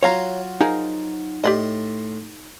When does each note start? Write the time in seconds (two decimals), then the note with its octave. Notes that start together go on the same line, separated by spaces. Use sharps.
0.03 F#3 F4 F#4 C#5 F5 A#5
0.61 F3 D#4 G#4 A#4
1.44 A2 G4 D5 D#5 C6